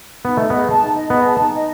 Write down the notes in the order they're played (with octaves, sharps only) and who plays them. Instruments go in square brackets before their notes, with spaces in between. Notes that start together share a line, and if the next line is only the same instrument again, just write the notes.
[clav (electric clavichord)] B3 [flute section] D#4
[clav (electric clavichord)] A3 [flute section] D#5
[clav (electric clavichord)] B3 [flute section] G#4
[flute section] A5
D#4
D#5
[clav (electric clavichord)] B3 [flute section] G#4
[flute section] A5
D#4
D#5